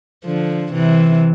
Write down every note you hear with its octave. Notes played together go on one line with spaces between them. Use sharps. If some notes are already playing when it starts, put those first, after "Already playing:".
D3 F3
C3 E3